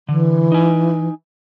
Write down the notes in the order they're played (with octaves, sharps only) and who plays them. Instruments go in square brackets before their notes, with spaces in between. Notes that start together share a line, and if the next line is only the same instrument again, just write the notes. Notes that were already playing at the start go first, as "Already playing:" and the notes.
[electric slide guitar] D3 [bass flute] E3
[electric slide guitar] D#4 G#5